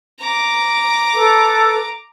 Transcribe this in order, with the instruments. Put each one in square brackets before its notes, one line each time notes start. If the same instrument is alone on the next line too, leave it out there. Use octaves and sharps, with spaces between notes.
[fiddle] A#5 D6
[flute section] A4 B4